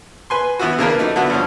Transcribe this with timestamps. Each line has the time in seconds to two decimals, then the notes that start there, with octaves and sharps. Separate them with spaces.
0.30 B4 G#5 C6
0.59 E3 B3 E4 F#4
0.79 C#3 E3 A#3 D4 A#4 B4
0.99 F#3 A3 D#4
1.16 D3 A3 B3 E4 F#4
1.30 G2 D3 F3 C#4